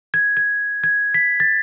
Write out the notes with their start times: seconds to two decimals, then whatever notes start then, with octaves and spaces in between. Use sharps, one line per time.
0.14 G#6
0.37 G#6
0.84 G#6
1.14 B6
1.40 A6